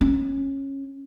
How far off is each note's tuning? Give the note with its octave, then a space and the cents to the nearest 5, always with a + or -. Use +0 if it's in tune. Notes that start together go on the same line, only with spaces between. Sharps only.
C#4 -20